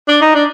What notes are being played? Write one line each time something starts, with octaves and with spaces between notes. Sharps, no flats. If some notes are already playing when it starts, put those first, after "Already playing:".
D4
D#4
D4